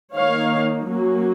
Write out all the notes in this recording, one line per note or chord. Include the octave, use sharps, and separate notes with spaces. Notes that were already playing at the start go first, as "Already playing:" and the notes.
D#3 A#3 D#4 C#5 F5
F#3 A#3 C#4